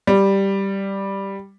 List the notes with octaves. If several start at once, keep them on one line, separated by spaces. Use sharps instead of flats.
G3